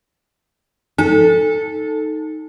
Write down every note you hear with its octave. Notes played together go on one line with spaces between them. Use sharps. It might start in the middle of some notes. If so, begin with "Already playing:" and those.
D#4 A4